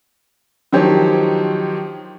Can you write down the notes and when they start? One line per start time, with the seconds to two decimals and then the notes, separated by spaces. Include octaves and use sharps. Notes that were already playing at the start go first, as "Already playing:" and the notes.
0.73 D#3 F3 F#3 G4 C5 C#5